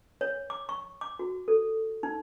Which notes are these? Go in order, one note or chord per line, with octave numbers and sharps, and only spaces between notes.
C#5
D6
C#6
D6
F#4
A4
D#4